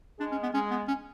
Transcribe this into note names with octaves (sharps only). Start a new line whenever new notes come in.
G#3 D4
C#4
B3
G#3 C#4
B3
C#4